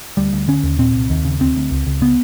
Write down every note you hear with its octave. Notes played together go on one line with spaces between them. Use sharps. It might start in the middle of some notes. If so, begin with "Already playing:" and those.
D2 G3
D2
D3 C#4
D#2
A#2 C4
C2
D#2
C#3
D2 C4
D2
C#2
C#2
C#3 B3